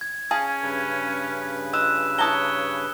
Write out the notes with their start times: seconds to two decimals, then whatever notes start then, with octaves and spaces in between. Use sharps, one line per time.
0.01 G#6
0.31 C#4 G#4 F5 G#5 A5
0.63 G2 C#3 B4
1.73 F4 D#5 E6 F#6 E7
2.19 E4 C#5 A5 A#5 D#6 G7